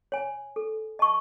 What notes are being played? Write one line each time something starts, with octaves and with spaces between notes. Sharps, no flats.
C#5 G#5
A4
D#5 A5 C#6